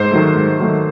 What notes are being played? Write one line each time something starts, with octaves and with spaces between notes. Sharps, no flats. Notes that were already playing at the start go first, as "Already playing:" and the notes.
Already playing: G#2 C5
D#3 F#3 A3
G#2
D#3 F#3 A3